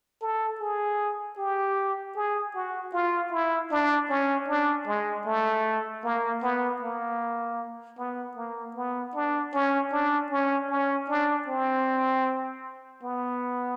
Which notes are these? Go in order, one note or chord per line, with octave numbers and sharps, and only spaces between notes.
A4
G#4
G4
G#4
F#4
F4
E4
D4
C#4
D4
G#3
A3
A#3
B3
A#3
B3
A#3
B3
D4
C#4
D4
C#4
C#4
D4
C4
B3